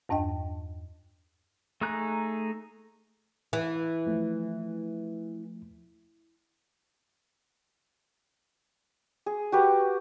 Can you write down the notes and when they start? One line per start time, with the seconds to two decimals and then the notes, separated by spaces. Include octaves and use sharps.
0.09 E2 G2 D4 D#5 G5
1.81 A3 D#4 G#4 A#5 F#6
3.53 E3
4.06 F3 A3
9.26 G#4
9.52 F#4 G4 B4